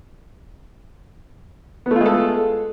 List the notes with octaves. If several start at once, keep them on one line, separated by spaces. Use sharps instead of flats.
G#3 A3 B3 F4 A4